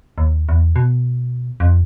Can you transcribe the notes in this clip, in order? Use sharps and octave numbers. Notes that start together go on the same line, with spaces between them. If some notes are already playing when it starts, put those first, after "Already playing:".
D#2
E2
B2
F2